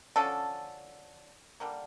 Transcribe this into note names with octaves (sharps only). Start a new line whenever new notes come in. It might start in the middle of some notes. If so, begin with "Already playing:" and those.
D3 F3 C#4 A4
D3 G3 A#3